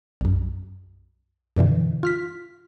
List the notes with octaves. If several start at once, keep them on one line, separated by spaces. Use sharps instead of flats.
B1 F#2
F#2 B2 D3 E3
F4 F6 B6